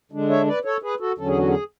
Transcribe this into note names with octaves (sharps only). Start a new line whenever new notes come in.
D3 G#3 D4
C#5 E5
B4 D5
A4 C#5
G#4 B4
F#4 A4
E2 D3 F#3 C#4 A4
G#4
F#4
G#4